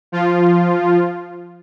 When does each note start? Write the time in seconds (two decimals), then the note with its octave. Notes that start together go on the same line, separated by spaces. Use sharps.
0.12 F3 F4